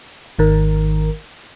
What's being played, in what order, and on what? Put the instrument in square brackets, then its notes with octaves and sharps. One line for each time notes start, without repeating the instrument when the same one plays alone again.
[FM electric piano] G#1 D#3 A#4